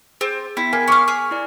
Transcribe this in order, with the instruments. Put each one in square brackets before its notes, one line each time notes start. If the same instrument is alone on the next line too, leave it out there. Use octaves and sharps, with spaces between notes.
[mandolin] C4 [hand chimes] G#4
[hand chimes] B3 G5 B6 [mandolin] E4
[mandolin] A#3 [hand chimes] A#4 [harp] G#5
[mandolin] C#4 F5 [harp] C#6 D6 C#7
[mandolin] G#4 [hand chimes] F6
[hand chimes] E4 D5